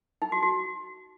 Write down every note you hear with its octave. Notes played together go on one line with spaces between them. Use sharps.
D#4
F#4
F#4